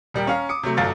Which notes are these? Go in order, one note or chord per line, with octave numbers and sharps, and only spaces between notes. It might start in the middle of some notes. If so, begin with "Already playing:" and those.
D#1 G3 A#4 G5
C#4 F5 A#5
D6 D#6 C#7
C3 F#3 A3
G1 F#2 F#3 A4 F5 A6